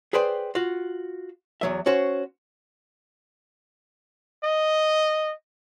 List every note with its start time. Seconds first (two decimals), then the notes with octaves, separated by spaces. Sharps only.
0.13 G#4 B4 C5 D5 G5
0.55 F4 F#4
1.61 E2 F#3 E5
1.86 C#4 F#4 C5
4.44 D#5